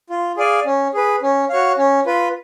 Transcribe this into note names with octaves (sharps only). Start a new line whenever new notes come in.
F4
G#4 D5 F5 G#5
C#4
G#4 B4
C#4
F#4 C#5 F5
C#4
F4 B4